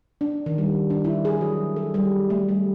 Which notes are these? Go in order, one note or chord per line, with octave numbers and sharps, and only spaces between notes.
D4
D#3
G3
D4
E4
G#4
F#3
A4
G3
A3
G3